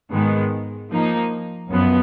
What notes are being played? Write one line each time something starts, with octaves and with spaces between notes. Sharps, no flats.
G#2 D#3 G#3 B3
F3 A#3 D#4
F#2 F3 B3